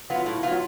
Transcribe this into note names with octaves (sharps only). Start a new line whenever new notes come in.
F#3 B3 F4
A2
F#3 B3 F4